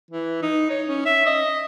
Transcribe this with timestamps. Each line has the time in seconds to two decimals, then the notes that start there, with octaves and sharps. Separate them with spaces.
0.11 E3
0.42 D#4
0.70 C#5
0.88 C#4
1.05 E5
1.26 D#5